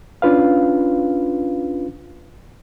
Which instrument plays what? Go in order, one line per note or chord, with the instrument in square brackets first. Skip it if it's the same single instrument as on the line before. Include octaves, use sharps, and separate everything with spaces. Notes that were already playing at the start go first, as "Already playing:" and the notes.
[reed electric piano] C#4 D4 F4 B4 F5